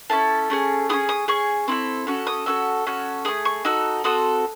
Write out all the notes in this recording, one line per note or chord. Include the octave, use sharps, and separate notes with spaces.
C#4 E4 A4 A5
A3 C#4 G#4
C#4 E4 G#4 D#6
D#6
C#4 G#4 C#6
C4 E4 A4
C#4 F#4 A4
D#6
C#4 F#4 A4 E6
C#4 F#4 A4
A3 C#4 G#4 D#6
C#6
D#4 F#4 A4 E6
C4 F#4 A4 D#6